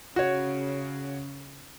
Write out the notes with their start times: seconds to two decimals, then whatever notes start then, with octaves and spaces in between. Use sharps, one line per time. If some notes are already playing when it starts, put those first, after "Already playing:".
0.16 C#3 F#4 C#5